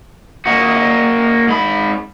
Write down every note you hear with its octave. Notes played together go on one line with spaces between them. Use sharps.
A#3 F#4
G#2 B5